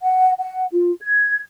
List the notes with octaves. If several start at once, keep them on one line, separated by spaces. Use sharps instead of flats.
F#5
F#5
F4
G#6